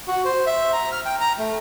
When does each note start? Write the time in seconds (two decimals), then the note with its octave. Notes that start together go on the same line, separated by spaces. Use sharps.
0.08 F#4
0.25 C5
0.46 E5
0.73 A#5
0.92 F6
1.05 G5
1.21 A#5
1.39 A3